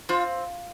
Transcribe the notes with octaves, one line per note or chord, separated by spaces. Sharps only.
C4 F4